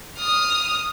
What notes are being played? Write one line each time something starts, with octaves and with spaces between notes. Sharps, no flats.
D#6 F6